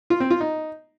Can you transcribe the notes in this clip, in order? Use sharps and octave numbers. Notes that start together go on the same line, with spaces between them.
F4
C4
F4
D#4